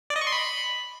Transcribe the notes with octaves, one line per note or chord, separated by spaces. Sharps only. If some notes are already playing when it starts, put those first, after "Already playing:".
D5
D#5
C#6
C6
B5